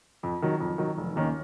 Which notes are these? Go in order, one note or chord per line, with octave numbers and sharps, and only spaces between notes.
F2
D#3 F#3
F2
D#3 F#3
F1
D#2 D#3 A#3 C#4